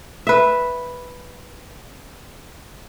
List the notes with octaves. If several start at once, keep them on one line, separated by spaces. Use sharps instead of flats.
B4 E5